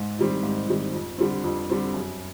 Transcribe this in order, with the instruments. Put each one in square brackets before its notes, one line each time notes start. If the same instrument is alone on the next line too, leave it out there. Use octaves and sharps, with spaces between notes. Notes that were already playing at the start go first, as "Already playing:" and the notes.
Already playing: [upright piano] G#2
D#3 G3 C4
G#2
D#3 G3 C4
F2
D3 G3 C4
F2
D3 G3 C4
F#2